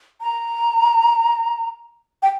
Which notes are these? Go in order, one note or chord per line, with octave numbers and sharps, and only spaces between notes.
A#5
G5